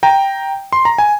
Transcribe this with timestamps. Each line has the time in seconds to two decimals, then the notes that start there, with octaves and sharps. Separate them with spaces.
0.03 G5 A#5
0.73 C6
0.85 A#5
0.98 G#5